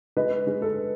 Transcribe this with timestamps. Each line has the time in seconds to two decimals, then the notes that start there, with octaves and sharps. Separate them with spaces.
0.17 G#3 B4 D#5
0.47 G#3
0.62 A4